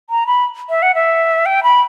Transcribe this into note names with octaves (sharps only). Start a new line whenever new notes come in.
A#5
B5
E5
F#5
E5
G5
B5